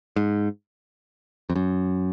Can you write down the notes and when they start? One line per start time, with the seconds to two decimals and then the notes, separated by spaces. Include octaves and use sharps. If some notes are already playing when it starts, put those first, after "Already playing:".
0.16 G#2
1.50 F2
1.56 F#2